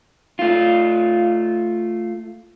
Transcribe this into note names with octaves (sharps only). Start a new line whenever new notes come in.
A3 F4